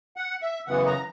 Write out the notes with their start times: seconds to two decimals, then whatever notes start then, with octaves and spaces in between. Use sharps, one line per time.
0.17 F#5
0.42 E5
0.67 F#2 C#3 E3 B3 F#5
0.86 A#5